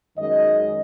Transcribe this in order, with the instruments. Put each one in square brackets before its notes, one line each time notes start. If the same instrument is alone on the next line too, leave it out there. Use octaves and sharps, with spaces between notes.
[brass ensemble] F#2 D#3 G#3 D#5